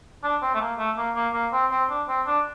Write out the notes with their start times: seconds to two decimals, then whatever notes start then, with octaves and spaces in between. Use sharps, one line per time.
0.23 D4
0.42 C4
0.55 A3
0.61 A#3
0.79 A3
0.98 A#3
1.16 A#3
1.34 A#3
1.53 C4
1.71 C4
1.90 D4
2.08 C4
2.26 D4